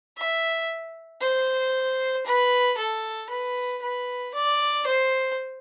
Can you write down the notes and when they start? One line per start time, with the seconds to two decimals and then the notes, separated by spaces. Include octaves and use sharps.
0.17 E5
1.21 C5
2.26 B4
2.78 A4
3.29 B4
3.82 B4
4.34 D5
4.86 C5